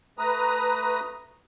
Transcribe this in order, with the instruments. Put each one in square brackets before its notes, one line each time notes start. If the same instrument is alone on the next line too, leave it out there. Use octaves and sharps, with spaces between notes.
[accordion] A3 B4 A#5 D#6